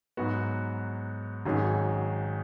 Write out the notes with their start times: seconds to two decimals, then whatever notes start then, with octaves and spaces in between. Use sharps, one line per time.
0.17 G#2 F#3 B3 F#4
1.45 G#1 G#2 F#3 C#4 G#4